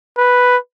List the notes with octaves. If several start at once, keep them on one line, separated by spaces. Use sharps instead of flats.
B4